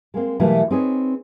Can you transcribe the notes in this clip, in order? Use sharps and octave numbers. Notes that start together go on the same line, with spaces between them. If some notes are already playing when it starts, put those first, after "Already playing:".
G#3 A#3 C4
B2 E3 F#3 G3 A3 A#3
C4 D#4 G#4 B4 C#5